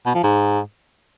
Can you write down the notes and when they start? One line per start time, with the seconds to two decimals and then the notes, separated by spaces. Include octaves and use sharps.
0.06 B2
0.15 F3
0.23 G#2